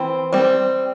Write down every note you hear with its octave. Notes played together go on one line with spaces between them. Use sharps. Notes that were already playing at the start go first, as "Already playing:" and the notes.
Already playing: E3 C4
G3 C4